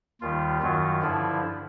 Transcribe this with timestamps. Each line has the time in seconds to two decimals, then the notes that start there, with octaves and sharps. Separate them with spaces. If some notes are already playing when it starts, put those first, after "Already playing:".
0.21 D#2 D#3 G3 F4
0.62 F#2 D#3 F#3 F4
1.02 G2 D3 F3 E4